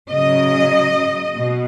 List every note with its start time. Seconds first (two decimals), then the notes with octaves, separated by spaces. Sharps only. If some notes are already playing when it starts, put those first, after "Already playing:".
0.11 C#3 F#3 D#5
1.37 B2